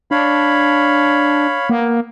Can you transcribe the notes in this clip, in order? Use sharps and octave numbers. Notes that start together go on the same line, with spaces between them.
D4 C#5 F5 B5
A#3 B3